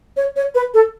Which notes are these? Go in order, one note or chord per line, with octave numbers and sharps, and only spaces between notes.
C#5
C#5
B4
A4